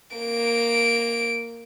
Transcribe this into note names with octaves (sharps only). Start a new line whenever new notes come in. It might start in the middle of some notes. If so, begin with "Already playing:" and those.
A#3 D7